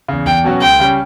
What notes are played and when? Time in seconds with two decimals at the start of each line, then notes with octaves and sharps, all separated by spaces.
0.08 E2 C#3
0.26 E2 G5
0.44 B2 F#3 C#4 F#4
0.61 C#2 G5
0.80 C#3 G3 C#4